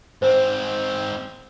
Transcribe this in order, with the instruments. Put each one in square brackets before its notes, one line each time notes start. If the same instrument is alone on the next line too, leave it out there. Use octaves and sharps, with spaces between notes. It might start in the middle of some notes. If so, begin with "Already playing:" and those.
[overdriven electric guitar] G#2 C4 [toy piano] C5